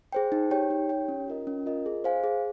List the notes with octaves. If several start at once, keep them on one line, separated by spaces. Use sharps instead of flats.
G#4 C5 G5
D#4
G4 C#5 G5
D#4
G4 C#5 G5
C#4
F4 A#4 D#5
C#4
F4 A#4 D#5
G#4
C5 F5 G#5
G#4